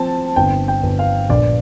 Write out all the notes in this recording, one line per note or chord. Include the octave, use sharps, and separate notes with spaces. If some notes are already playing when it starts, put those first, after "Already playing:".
Already playing: F3 C4 A5
G1 G5
G5
G1
F5
A#1 D5